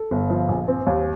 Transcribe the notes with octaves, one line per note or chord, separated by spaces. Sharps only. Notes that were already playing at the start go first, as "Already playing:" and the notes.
Already playing: A4
G1
F3
A#1
C4
D#2